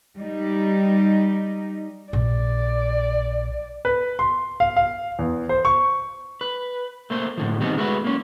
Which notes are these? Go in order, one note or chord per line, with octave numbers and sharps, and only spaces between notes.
G3 D#4
A#1 D5
B4
C6
F5
F5
E2
C5
C#6
B4
A3 A#3 C5
A2 D3 F3
D#3 G3 B3 C4 D#4
G#3 A3 F#4 G4 B4
A#3 C#4